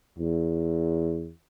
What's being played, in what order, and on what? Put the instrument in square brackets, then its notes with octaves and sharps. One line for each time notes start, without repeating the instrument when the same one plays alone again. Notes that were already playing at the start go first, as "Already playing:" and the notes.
[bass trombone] E2